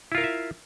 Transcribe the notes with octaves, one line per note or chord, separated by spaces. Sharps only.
E4 F4 A#4 E5 F5